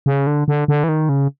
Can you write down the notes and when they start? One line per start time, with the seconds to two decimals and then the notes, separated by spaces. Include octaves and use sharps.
0.06 C#3
0.27 D3
0.48 D3
0.68 D3
0.84 E3
0.89 D#3
1.09 C#3